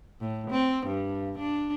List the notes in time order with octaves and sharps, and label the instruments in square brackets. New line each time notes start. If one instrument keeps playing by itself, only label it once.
[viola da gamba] A2
C4
G2
D4